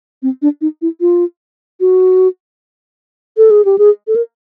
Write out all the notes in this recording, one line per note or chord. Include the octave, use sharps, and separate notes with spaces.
C4
D4
D#4
E4
F4
F#4
A4
G#4
G4
G#4
A4
A#4